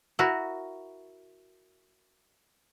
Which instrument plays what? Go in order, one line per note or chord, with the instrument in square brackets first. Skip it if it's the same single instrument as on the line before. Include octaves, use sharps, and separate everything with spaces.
[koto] E4 F#4 A#4